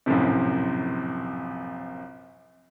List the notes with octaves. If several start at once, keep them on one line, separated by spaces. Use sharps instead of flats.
A#1 F#2 A2 C3